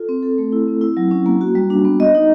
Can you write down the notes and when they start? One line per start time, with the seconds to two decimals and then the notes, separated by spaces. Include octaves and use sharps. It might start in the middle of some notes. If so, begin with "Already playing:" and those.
Already playing: F4 A4
0.09 C4
0.23 A4
0.38 A3
0.52 E4
0.68 C4
0.81 E4
0.97 F#3
1.11 C#4
1.26 A#3
1.41 F#4
1.55 G3
1.70 D4
1.85 B3
2.00 D#5
2.15 D#4